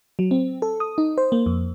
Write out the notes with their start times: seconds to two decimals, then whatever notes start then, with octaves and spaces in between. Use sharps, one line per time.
0.19 F#3
0.31 C4
0.62 A4
0.80 D#6
0.98 D#4
1.18 C5
1.32 A#3
1.46 F2